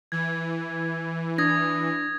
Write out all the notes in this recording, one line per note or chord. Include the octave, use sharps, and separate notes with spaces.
E3 G#6
D4 D#6 G#6 A#6